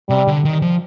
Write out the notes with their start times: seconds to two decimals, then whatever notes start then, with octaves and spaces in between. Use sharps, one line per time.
0.09 C3 G3
0.28 D3
0.45 D#3
0.62 F3